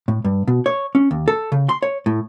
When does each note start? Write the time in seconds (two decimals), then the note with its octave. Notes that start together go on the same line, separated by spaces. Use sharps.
0.08 A2
0.25 G2
0.47 B2
0.66 C#5
0.95 C#4
1.11 D#2
1.28 A4
1.52 C#3
1.69 C6
1.83 C#5
2.06 A2